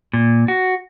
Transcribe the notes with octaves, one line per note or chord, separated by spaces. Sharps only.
A#2
F#4